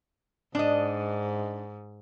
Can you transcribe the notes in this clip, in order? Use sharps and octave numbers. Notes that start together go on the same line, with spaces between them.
G#2 D4 D#5